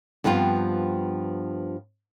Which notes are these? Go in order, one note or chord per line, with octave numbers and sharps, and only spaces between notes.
G2 F3 B3 C4 F4